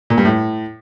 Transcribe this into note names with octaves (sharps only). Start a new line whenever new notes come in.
A#2
G2
A2